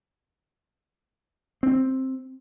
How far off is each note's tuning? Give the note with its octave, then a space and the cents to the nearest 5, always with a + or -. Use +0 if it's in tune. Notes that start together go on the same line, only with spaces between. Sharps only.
C4 +5